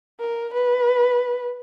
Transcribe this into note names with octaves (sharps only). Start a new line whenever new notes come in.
A#4
B4